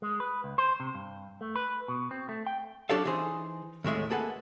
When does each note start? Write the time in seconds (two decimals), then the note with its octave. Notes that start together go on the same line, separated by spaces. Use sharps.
0.02 G#3
0.20 B4
0.44 C#2
0.58 C5
0.80 C3
0.95 G2
1.41 A3
1.56 B4
1.88 B2
2.11 C4
2.29 A3
2.47 G5
2.89 F#3 D4 G4 A4 C#5 F5
3.05 E3 D#4 G#4 C5
3.84 D#2 A2 G#3 E5
4.10 A#3 G#4 A4 B4 F#5